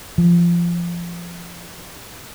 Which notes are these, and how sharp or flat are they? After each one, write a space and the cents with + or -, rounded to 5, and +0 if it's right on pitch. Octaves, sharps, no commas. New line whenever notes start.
F3 -20